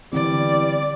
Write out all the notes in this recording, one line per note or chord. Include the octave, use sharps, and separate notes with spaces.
D3 E3 G3 B3 C4 D5